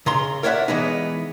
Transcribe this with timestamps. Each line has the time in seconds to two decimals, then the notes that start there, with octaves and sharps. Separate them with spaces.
0.06 C#3 A#5 C6
0.43 A#4 C#5 D5 E5 F#5
0.68 E3 G#3 B3 D#4